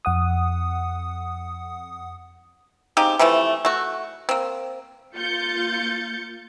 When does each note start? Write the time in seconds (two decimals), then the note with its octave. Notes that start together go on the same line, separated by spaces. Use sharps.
0.05 F2 F#5 D#6
2.97 C#3 C4 D#4 G4
3.19 C3 E3 F3 A3
3.65 A3 F#4
4.29 A#3 C4
5.15 A#3 F4 G6 A6 C#7